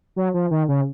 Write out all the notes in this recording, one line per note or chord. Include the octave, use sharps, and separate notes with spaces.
F#3
F3
D#3
C#3